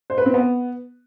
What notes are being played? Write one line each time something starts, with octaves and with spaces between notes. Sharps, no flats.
C5
B4
C4
B3